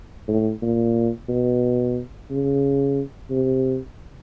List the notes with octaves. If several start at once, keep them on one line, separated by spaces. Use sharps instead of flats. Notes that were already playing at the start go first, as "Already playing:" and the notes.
A2
A#2
B2
C#3
C3